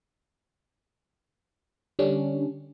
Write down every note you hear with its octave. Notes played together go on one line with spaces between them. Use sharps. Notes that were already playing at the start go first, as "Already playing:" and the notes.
D3 G3 C#4 D4